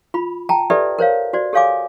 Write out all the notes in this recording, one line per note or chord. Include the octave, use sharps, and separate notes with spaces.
F4 B5
G5 A5 A#5
G4 A4 B4 D5 E5
A#4 C5 C#5 F5
F#4 C5 D5
G4 A4 C#5 F5 G#5 D6